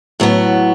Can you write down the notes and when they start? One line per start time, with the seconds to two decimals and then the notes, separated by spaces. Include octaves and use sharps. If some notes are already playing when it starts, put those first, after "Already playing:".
0.20 A2 F#3 B3